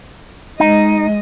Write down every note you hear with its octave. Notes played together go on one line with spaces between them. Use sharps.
G#3 D#4 D#5